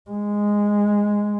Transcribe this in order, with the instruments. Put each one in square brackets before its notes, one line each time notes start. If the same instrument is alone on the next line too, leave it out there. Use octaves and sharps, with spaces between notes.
[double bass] G#3